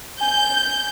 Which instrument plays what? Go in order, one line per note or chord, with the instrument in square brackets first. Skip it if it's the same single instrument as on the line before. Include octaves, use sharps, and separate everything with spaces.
[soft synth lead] G#5 [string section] G6